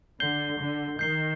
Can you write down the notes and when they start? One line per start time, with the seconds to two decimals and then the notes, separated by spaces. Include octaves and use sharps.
0.20 D3 G6 C7 G7
0.59 D3
0.99 D#3 G6 C7 G7